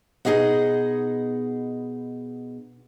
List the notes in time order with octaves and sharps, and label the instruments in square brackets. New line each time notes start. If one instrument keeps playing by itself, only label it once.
[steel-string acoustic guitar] B2 D#4 G#4 D#5 F#5